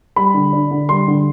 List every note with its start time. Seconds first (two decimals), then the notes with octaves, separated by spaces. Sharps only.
0.16 G3 B5
0.34 D3
0.53 D4
0.71 D3
0.89 G3 C6
1.08 D3